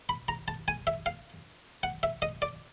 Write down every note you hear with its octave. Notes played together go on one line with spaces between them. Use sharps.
B5
A#5
A5
G#5
E5
F5
F#5
E5
D#5
D5